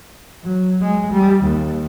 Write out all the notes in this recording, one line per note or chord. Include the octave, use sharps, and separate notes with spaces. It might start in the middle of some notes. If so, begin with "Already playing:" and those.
F#3
G#3
G3
D#2